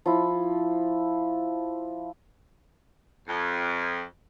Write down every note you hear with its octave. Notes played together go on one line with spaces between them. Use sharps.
F3 E4
F2